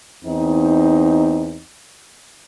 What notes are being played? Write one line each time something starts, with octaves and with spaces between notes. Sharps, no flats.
E2 C4 D#4